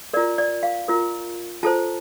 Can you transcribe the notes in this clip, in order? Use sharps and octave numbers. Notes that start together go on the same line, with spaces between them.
F4 A#4 D5
D5
F5
F4 A#4
F4 A4 C5 A5